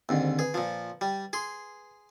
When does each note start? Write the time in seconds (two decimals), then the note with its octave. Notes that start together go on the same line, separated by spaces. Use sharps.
0.09 D#2 G#2 D3 D#3 C4
0.39 G#4 B4
0.54 A#2 F3
1.01 G3
1.33 G#4 C6